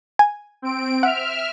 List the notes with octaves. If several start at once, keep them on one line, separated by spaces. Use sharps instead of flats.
G#5
C4 D7
E5 F#5 F6